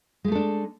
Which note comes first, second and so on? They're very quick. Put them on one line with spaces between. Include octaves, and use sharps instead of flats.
G#3 A3 A4 D4